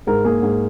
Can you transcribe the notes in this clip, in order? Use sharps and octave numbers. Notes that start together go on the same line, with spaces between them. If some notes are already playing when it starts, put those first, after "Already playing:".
G#2 A#4
A#3 G#4
G#2